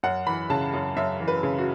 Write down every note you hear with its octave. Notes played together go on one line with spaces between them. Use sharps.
F#2 F#5
E3 B5
C#3 A5
F#2
F#2 E5
E3
B4
C#3
F#4